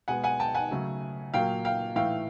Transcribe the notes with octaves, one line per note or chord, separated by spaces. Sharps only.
B2 G#3 B3 F#5 G#5
F#5 G#5
G5 A5
F#5 G#5
C#3 F#3 A3
A#2 F#3 A#3 F5 G5
F5 G5
A2 E3 A3 F5 G5